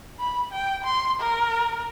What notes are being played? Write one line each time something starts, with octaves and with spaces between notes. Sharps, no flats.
B5
G5
C6
A#4